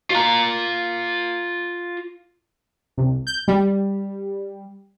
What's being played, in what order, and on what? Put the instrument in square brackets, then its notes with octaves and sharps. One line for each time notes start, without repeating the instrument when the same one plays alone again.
[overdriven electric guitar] F4 A#5
[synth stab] C2
G6
G3